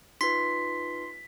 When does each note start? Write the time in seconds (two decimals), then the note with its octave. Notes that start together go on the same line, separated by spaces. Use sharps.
0.21 D#4 F4 B4 C6 B6